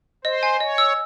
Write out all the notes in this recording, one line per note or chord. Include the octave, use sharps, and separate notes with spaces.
C5 D#5
G#5
C#5 D#5
E6